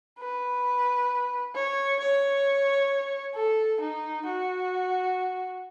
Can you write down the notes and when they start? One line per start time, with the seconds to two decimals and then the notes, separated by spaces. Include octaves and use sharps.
0.19 B4
1.55 C#5
1.99 C#5
3.34 A4
3.81 D#4
4.26 F#4